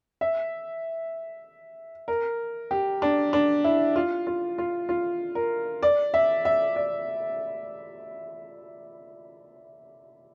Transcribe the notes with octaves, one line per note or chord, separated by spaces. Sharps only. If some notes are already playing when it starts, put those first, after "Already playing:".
E5
A#4
G4
D4
D4
E4
F4
F4
F4
F4
A#4
D5
E5
E5
D5